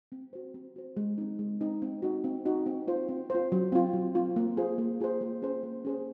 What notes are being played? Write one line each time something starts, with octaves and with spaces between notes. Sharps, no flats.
C4
F#4 C5
C4
F#4 C5
G#3
C4 D#4
G#3
C4 D#4
C4
D#4 F#4
C4
D#4 F#4
C4
F4 C5
C4
F4 C5
F#3
C4 F4
F#3
C4 F4
A#3
F4 G#4 C5
A#3
F4 G#4 C5
A#3
C#4 G#4 C5
A#3
C#4 G#4 C5